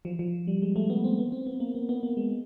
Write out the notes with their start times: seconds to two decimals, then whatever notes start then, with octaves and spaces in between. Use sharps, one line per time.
0.05 F3
0.19 F3
0.47 G3
0.62 G#3
0.76 A3
0.90 B3
1.04 C4
1.19 B3
1.32 C4
1.47 B3
1.60 A#3
1.75 B3
1.89 B3
2.03 A#3
2.17 G#3